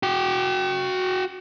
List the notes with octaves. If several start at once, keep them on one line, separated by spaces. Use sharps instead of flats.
F#4 G5